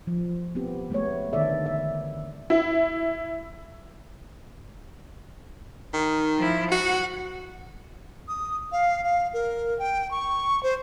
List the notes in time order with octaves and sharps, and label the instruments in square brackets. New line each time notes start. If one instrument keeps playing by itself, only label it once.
[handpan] F3
B3 C4 G4
G#3 A3 B3 C#5
D3 D#3 B3 A4 D5 E5
E5
[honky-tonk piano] E4
[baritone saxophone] D#3
[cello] F3 E4
[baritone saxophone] F#4 [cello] F#5
[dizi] D#6
F5
F5
A#4
G5
C#6
C5